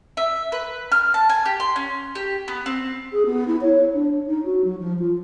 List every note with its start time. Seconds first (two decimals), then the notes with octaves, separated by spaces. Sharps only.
0.17 E5
0.52 B4
0.92 F6
1.14 A5
1.29 G#5
1.45 G4
1.60 C6
1.76 C#4
2.15 G4
2.48 B3
2.66 C4
3.12 G#4
3.26 B3
3.48 E4
3.61 C#5
3.94 D4
4.26 D#4
4.45 F#4
4.64 F#3
4.80 F3
4.99 F4